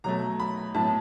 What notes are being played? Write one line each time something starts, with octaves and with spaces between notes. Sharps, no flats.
B2 F#3 A3 A#5
B5
A2 F#3 B3 A5